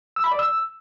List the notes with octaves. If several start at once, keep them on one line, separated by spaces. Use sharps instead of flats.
E6
B5
D5
E6